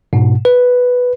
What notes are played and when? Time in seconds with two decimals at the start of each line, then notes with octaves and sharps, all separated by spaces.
0.13 G#2 B2
0.45 B4